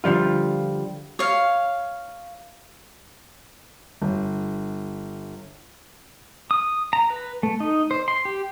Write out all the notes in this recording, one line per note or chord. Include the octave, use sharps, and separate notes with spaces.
D3 F3 G3 F4
C#5 F5
G1
D#6
A#5
B4
A3
D#4
C5
C6
G4